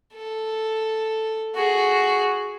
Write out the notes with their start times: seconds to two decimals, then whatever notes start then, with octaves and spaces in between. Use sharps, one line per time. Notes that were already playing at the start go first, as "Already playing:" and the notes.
0.14 A4
1.55 F#4 G#4